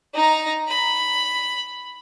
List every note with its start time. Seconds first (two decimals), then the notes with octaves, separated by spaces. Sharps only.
0.14 D#4 A#5
0.69 B5